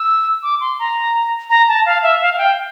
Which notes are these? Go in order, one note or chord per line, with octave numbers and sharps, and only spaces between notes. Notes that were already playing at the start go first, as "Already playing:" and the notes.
Already playing: E6
D6
C6
A#5
A#5
A5
F5
E5
F5
F5
G5